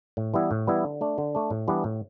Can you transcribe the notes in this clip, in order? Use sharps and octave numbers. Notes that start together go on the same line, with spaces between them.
A2
E3 G3 B3 E4
A2
E3 G3 B3 E4
D3
A3 D4
D3
A3 D4
A2
E3 G3 B3 D4
A2